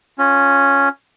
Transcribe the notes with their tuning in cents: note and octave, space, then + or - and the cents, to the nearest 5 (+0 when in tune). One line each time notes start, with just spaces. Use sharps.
C#4 +0 F4 +25